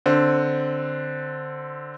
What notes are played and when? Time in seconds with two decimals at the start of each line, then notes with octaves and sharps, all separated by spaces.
0.06 D3 C4